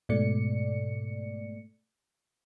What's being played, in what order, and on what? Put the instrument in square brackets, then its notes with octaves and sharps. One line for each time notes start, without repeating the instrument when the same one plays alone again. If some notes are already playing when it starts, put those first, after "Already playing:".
[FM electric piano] G#2 B2 A3 D5 C#7